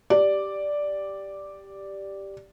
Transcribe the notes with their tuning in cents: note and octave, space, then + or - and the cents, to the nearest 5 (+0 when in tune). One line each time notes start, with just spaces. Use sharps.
G4 +0 D5 +0